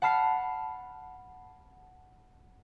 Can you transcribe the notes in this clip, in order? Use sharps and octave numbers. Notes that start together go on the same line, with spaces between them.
F#5 A5 B5 F6 C7